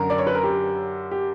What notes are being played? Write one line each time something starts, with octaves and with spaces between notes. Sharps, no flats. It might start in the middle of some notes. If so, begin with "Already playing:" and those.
Already playing: F#2 D3 A#4
D5
C#5
B4
A#4
G4
G4